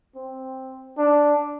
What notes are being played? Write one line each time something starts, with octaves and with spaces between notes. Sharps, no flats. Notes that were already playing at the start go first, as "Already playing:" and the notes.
C4
D4